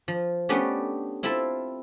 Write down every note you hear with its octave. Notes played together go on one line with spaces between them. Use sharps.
F3
A3 B3 C#4 D4 G4 B4
C4 E4 F4 A4 E5 A5